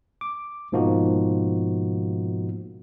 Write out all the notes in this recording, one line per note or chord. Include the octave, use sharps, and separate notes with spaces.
D6
G#2 B2 F3 A#3 D#4 F#4